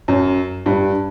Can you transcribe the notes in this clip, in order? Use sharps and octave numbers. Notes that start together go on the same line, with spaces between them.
F#2
G2